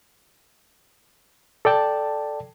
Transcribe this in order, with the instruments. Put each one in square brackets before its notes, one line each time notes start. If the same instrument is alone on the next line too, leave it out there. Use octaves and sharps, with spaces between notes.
[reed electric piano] A4 D5 G5 A5